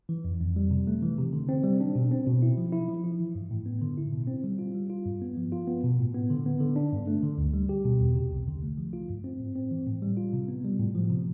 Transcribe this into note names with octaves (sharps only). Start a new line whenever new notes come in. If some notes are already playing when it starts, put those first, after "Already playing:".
E3
F2
F2
G3
C3
A3
E3
C3
D3
C4
G3
D4
B2
C4
B2
E4
F3
E4
F3
E4
E3
G2
A2
B3
D3
E4
B2
C4
G3
F4
G3
F4
G2
B3
F3
F4
B3
B2
A2
B3
D3
B3
D3
D4
G2
A3
D3
D2
G3
G4
B2
E2
C3
C2
D3
A3
F3
F4
G2
C4
A2
C4
E3
A2
G3
F4
C3
B3
G3
A2
F3
C3